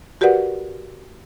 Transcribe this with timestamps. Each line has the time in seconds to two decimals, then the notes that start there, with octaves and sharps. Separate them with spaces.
0.21 F#4 G4 A#4 B4 D5 F#5